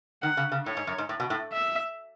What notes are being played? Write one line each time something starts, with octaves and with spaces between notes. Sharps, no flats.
D#3 F#5
C#3
C#3
A2 C#5
G#2
F#2
G#2
A2
B2
A2
E5